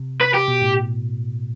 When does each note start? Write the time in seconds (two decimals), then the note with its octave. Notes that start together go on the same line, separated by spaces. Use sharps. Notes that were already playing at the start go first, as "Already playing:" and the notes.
Already playing: C3
0.21 B4
0.34 G4
0.48 B2
0.62 A2